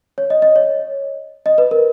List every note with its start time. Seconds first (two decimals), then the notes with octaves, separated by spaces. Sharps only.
0.18 C#5
0.30 D#5
0.42 D#5
0.56 C#5
1.46 D#5
1.58 B4
1.71 A#4